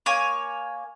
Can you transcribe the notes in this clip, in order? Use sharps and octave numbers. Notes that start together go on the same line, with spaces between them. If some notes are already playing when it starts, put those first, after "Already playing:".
A#3 C#5 G#5